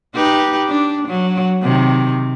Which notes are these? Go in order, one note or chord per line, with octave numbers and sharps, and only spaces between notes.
D#4 G4 B4
D4
F#3
C3 D#3